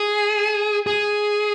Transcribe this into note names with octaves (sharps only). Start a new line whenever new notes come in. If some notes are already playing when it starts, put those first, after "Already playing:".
Already playing: G#4
G#4